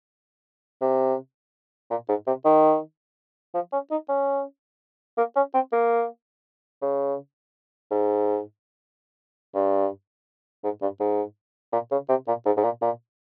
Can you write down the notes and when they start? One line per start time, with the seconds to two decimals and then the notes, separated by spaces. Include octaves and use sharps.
0.81 C3
1.90 A#2
2.09 G#2
2.27 C3
2.45 D#3
3.54 F3
3.73 C#4
3.91 D#4
4.09 C#4
5.18 A#3
5.36 C#4
5.54 C4
5.72 A#3
6.82 C#3
7.91 G#2
9.55 G2
10.64 G#2
10.82 G2
11.00 G#2
11.73 A#2
11.91 C#3
12.09 C3
12.28 A#2
12.46 G#2
12.57 G#2
12.64 A#2
12.82 A#2